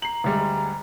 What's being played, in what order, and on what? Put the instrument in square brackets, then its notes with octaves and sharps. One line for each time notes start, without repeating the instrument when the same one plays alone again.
[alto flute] A#5 [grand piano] C7 F#7
[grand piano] D2 G3 G#3